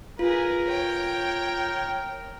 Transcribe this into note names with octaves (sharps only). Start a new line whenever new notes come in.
F4 G#4 A#4 B4
C#5 G5